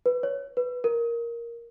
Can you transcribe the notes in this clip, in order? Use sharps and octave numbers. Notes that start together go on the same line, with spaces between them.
B4
C#5
B4
A#4